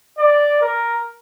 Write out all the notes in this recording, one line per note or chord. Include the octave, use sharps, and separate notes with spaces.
D5
A#4